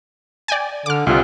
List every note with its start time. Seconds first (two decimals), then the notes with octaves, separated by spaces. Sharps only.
0.48 D5 G5 G#5
0.86 D3 D6 F6
1.07 C2 C3 F4